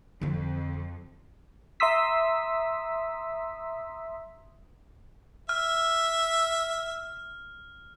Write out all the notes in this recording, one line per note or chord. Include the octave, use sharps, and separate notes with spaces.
F2 D3 C4
E5 A#5 C6 D#6 E6 B6
E5 F6